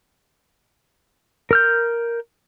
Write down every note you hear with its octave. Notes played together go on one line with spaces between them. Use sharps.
A#4 F6 G6